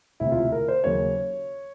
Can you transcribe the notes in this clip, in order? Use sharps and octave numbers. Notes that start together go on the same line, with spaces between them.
E1 D2 C3 E4
F4
E4
A#4
C5
D#2 C#3 F#3 A#3 C#5